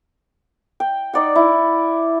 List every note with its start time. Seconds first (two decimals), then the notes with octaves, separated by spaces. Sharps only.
0.80 G5
1.13 D#4 D5 F#5
1.35 E4